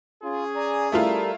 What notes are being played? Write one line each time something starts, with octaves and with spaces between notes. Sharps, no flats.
C#4 F4 G#4
D5 G#5 A#5
G3 A3 E4 F4 A4 A#4